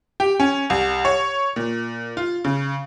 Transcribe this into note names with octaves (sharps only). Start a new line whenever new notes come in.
G4
C#4
C2
C#5
A#2
F4
C#3